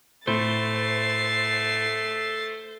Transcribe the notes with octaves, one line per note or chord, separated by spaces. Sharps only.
A2 A3 C5 A6 C7